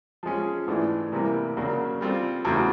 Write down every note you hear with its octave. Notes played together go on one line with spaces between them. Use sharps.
F3 G#3 C#4
G#2 E3 A3 D4
C3 E3 G3 A#3
C#3 F#3 A#3 D4 F#4
G3 C4 F4 A4
E2 C#3 F#3 A3